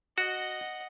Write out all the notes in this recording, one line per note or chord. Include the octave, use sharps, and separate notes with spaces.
F#4 D#5 F#5